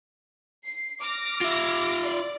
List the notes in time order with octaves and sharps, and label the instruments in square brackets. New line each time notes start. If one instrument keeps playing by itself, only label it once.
[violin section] C7
D6 F6 A#6
[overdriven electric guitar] F4 E5
[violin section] D5